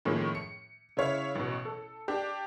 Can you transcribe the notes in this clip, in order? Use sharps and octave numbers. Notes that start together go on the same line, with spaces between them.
A2 D#3 F3 G#3 A#3 C#4
C#7
C#3 E4 C#5 F5
A1 B2
A4
D4 G4